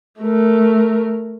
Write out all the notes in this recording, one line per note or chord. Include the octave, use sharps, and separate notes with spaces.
A3 A#4